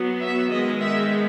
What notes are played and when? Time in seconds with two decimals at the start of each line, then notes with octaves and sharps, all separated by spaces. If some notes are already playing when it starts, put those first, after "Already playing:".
Already playing: F#3 B3
0.21 E5
0.51 D#3 G#3 B3 D#5
0.81 E5